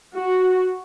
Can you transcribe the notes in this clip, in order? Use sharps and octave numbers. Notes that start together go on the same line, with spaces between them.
F#4